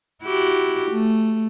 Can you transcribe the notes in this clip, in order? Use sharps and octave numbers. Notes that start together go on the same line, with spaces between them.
E4 F#4 G4
A3